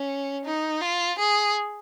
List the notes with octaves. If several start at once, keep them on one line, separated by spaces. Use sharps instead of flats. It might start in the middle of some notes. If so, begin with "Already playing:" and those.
Already playing: C#4
D#4
F4
G#4